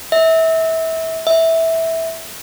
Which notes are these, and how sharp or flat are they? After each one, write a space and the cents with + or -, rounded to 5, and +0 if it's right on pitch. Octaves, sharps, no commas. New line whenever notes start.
E5 -25
E5 -10